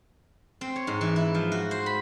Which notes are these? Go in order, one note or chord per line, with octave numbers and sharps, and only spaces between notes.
C4
C#5
G#2
E3
E4
F3
F#4
C5
B5